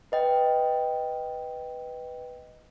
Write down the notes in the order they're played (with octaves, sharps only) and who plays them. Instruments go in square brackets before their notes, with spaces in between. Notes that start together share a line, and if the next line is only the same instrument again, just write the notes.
[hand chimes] B4 D#5 G5